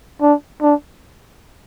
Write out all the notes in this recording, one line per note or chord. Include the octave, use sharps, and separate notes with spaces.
D4
D4